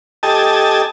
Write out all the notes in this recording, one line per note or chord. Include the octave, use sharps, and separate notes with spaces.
G4 A4 D#5 G#5 A5